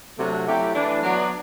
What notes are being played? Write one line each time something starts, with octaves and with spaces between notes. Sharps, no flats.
C3 F#3 A3 D4 F#4
F#3 A3 E4 G4
E3 A3 D4
F#3 B3 D4 F#4